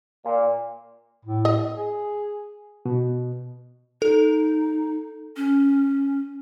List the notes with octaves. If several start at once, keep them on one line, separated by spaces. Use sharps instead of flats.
A#2
A2
D#5
G#4
B2
D#4 A4
C#4